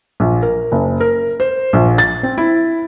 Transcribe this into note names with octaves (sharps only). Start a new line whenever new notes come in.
A#1
A#4
F#1
A#4
C5
A#1
A6
C4
E4